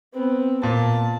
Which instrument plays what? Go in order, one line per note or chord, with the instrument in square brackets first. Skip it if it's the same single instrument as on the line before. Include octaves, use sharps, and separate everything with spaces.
[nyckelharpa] B3 C4
[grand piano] A#2 [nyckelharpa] A5